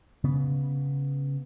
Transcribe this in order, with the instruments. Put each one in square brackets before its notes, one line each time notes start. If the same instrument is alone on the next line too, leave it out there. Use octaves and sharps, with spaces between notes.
[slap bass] C#3 B3